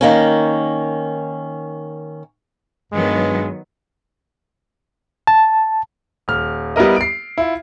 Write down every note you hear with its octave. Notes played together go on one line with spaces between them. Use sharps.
D#3 A#3 C#4
G2 D#3 F#3 G#3 B3
A5
D#1 F6
G3 B3 E4 A#4 D#5
C7 D7
E4 F4